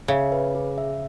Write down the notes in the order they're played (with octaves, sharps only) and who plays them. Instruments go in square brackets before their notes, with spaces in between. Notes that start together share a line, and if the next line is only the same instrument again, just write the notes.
[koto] C#3 [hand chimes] E5
[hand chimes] B4
G#4
E5